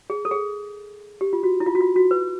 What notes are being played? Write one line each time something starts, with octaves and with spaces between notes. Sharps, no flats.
G#4
A4
G#4
G4
F4
F#4
E4
F4
F#4
F4
F#4
B4